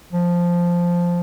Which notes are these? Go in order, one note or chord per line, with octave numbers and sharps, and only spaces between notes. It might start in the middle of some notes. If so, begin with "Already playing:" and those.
F3